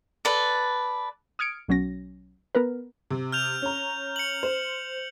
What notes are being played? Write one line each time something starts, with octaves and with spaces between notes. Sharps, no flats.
A4 B4 D5
D#6 F6 G#6 C#7 D7
B1 F#3 C#4 A#6
B3 A#4 B4
C3
F6 G6 F7
C#4 A#5
C#7 F#7
C5